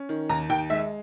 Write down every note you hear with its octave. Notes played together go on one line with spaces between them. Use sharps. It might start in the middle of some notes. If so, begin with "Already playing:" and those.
Already playing: C#4
D#3
D#2 A#5
D#2 G5
G#3 E5